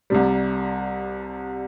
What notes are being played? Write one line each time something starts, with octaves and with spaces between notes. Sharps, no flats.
C2 C3 G3